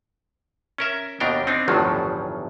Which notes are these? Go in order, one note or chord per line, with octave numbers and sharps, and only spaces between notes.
C#4 A#4 E5
D#2 B2 D4 A#4 G5
C4 D4 D#4
G1 E2 A2 D#3 F3 F#3